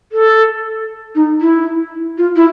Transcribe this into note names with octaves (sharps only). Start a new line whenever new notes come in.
A4
D#4
E4
F4
E4